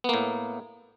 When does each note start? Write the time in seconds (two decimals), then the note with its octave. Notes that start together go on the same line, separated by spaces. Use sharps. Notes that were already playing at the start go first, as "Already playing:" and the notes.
0.04 B3
0.09 A#3
0.14 A2